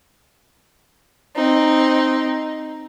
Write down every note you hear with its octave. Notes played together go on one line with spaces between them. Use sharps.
C4 D#4